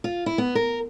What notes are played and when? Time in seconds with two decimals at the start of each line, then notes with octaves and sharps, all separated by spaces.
0.04 F4
0.26 E4
0.38 B3
0.55 A#4